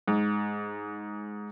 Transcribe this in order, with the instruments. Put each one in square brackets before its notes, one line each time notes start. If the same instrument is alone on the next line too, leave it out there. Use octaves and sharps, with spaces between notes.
[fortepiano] G#2